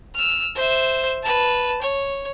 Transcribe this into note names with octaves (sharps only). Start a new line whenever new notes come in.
E6 F6
C5 E5
B4 A5
C#5